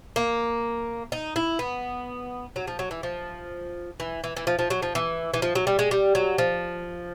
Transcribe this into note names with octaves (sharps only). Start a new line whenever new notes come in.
A#3
D#4
E4
B3
F#3
F3
F#3
E3
F3
E3
E3
E3
F3
F3
F#3
F3
E3
E3
F3
F#3
G3
G#3
G3
F#3
F3